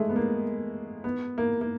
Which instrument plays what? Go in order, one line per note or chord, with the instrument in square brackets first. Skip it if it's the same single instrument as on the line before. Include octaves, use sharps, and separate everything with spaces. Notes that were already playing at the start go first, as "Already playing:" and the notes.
Already playing: [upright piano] G#3 A3
B3
A#3
B3
A#3
A#3